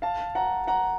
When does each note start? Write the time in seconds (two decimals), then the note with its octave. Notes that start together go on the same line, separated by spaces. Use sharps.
0.02 F5 A5
0.35 F#5 A#5
0.67 F#5 A#5